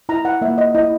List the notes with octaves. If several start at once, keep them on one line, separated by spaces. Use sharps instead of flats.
E4 A#5
F#5
A#3 E5
D#5
E4 D#5